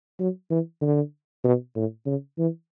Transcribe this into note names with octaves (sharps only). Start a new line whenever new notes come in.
F#3
E3
D3
B2
A2
C#3
E3